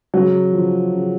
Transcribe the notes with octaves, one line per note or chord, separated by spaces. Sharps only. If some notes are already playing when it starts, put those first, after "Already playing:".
C#3 F#3
F3
C#3